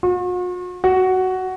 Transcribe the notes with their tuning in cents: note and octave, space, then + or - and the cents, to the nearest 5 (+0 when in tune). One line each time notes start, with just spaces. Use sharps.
F#4 -45
F#4 +10